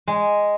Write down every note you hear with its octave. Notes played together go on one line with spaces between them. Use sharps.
G#3